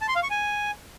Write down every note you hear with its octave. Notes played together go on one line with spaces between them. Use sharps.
A5
C6
F5
C#6
G#5